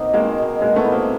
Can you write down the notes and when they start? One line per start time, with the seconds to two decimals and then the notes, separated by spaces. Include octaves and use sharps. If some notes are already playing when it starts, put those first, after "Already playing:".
Already playing: B2 A#3 C4 D#4
0.14 D#3 G#3 A#3
0.38 D#4
0.61 B2 G#3 A#3
0.76 A3 B3
0.84 E4
0.92 A#3 C4